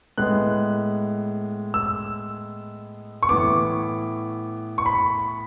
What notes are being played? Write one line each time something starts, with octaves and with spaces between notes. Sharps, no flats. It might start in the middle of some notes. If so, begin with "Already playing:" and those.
A2 G#3 B3 F#6
E6
C#6
A2 E3 B3 D6
C#6
B5